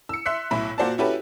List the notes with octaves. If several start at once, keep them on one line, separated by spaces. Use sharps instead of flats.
E6 C#7
E5 C6 E6 F#6 B6 C#7
B1 A2 E4 B5
A#2 A#3 F#4 C5 D5 A5
C#4 E4 F#4 G4 A4 B4